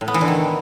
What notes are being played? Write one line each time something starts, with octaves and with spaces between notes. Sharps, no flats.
A2
B3
E3
D3
D#3